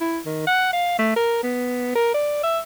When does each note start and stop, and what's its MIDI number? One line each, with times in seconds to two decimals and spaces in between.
0.01 0.19 64
0.26 0.42 51
0.47 0.70 78
0.73 0.94 77
0.98 1.14 57
1.16 1.38 70
1.43 1.94 59
1.95 2.11 70
2.14 2.39 74
2.43 2.59 76